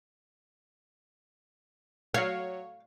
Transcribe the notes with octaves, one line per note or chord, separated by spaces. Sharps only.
F#3 C#5 F5